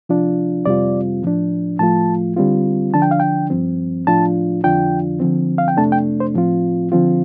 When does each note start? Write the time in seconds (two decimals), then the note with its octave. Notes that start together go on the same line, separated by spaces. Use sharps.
0.09 C3 F3 D4 F4
0.65 F2 C3 G3 C4 F4 D5
1.23 A2 F3 D4
1.79 A2 F3 A3 F4 A5
2.36 D3 G3 C4 F4
2.94 D3 F3 D4 A5
3.02 G5
3.11 F5
3.20 G5
3.50 G2 F3 C4
4.07 A2 F3 D4 F4 A5
4.64 F2 D3 F3 D4 F4 G5
5.20 D3 F3 C4
5.58 F5
5.68 G5
5.77 F2 C3 A3 D4 A5
5.92 G5
6.20 C5
6.34 A2 F3 C4 F4
6.92 D3 F3 C4 F4